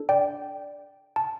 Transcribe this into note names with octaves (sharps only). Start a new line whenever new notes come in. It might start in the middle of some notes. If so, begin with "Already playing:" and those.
Already playing: D4 A4
D5 G5
A5